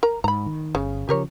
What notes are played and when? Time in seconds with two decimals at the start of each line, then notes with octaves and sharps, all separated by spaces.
0.03 A#4 A#5
0.24 G#2 A#5 B5
0.46 D#3
0.75 G1 C#3
1.09 C#3 F3 G4 A#4 C#5